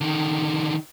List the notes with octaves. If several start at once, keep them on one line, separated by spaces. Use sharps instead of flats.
D3 D#3